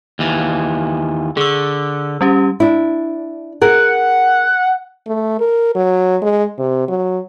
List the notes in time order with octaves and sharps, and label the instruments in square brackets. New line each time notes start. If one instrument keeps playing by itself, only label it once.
[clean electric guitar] D#2 E3
[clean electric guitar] D3 [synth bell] G#4 E6
[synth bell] G3 C#4 G4
[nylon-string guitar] D4 E4
[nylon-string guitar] G#4 A#4 [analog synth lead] F#5
[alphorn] A3
A#4
F#3
G#3
C3
F#3